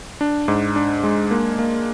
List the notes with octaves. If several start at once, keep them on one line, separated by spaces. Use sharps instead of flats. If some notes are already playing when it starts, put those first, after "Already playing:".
D4
G#2
D4
G#3
A#3
A#3